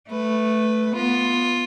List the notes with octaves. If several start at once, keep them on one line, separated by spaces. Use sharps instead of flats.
A3 B4
B3 F4